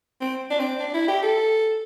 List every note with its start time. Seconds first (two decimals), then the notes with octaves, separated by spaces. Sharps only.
0.21 C4
0.50 D4
0.59 C4
0.79 D4
0.94 E4
1.08 G4
1.23 A4